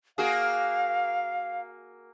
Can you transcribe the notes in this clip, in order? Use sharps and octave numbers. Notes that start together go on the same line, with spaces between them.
A#3 F#4 G#4 F5